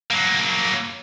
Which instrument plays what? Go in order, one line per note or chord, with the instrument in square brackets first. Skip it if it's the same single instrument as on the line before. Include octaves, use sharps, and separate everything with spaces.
[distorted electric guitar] F#3 A#3